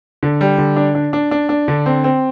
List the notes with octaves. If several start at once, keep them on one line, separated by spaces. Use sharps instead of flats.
D3
G3
D3
D4
D4
D4
D4
D4
D3
C4
C4